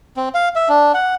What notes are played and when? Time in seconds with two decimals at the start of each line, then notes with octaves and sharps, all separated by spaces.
0.17 C4
0.35 F5
0.56 E5
0.69 D4
0.94 F#5